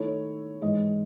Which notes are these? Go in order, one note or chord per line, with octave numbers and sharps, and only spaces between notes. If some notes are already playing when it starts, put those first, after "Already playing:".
Already playing: D#3 A3 E4 C#5
G#2 E3 G#3 D#5